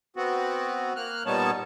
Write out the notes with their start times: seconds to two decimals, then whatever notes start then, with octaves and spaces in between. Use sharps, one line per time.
0.16 B3 C4 F#4
0.96 A#3 F6 F#6
1.26 A#2 G3 B3 D#4 C#5 A5